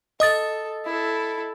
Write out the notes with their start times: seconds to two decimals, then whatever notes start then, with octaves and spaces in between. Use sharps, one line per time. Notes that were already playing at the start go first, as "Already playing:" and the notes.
0.20 A4 D#5 D#6 A6
0.85 E4 A4